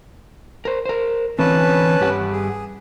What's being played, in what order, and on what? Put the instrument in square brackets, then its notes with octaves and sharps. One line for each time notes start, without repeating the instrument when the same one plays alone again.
[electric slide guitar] A#4 C5
A#4 C5
[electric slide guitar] D3 E3 C4 [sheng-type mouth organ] C#4 B4 A5
[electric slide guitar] G2 G4 F#5
[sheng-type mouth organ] G#4